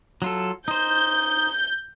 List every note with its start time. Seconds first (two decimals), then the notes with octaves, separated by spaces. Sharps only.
0.22 F#3 F4 A4
0.68 D#4 C5 G6